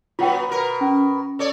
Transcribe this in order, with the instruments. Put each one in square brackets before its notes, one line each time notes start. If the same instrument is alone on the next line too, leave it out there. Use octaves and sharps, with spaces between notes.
[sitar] A#2 F#3 B3 [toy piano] F4 F#5 G5
[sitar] B2 A#4
[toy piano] C#4
[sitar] A4 C#5 D5